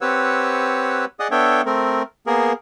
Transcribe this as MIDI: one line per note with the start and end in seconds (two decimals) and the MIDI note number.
0.01 1.05 60
0.01 1.05 67
0.01 1.05 71
0.01 1.05 73
0.01 1.05 78
0.01 1.05 88
1.20 1.28 68
1.20 1.28 74
1.20 1.28 75
1.20 1.28 78
1.20 1.28 87
1.31 1.62 59
1.31 1.62 62
1.31 1.62 69
1.31 1.62 73
1.31 1.62 76
1.31 1.62 79
1.66 2.03 57
1.66 2.03 60
1.66 2.03 70
2.27 2.53 58
2.27 2.53 59
2.27 2.53 68
2.27 2.53 70